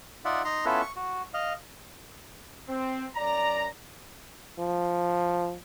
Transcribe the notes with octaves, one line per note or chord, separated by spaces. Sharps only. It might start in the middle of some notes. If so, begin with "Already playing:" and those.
D#4 F4 D5 E5 F#5
D#4 A#5 C6
B3 C#4 E4 F4 A4 B4
C#6
F#4
D#5 F5
C4
F#2 D5 A#5
F3